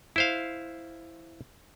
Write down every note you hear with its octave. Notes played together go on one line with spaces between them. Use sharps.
E4 C5 F5